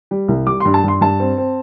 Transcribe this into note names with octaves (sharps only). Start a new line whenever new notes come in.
G3
C2
G3 D6
C6
G2
A5
G2 C6
G2 A5
C4
C4